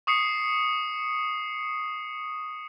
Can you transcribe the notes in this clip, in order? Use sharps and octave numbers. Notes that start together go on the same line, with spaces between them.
C#6 D#6 C7 C#7